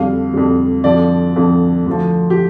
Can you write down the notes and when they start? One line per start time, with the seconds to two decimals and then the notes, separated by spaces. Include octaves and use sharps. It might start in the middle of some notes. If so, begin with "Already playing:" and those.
Already playing: F2 D3 G3 F5
0.33 F2 D3 G3
0.84 F2 D3 F3 D5
1.36 F2 D3 F3
1.86 D2 D3 F3
2.30 G4